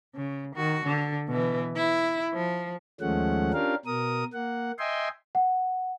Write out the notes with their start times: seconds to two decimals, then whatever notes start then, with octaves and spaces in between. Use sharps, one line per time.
0.15 C#3
0.55 D#3 F#4
0.84 D3
1.28 B2 E3
1.76 E4
2.33 F3
3.01 D#2 F3 G#3 A3 C#4 F#5
3.53 C#4 D4 F4 G4 A#4 F5
3.86 B2 A#4 D#6
4.33 A#3 F#5
4.79 D#5 E5 G5 G#5 C6
5.35 F#5